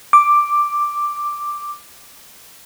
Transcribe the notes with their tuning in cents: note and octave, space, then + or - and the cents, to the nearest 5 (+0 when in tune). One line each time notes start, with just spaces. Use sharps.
D6 +5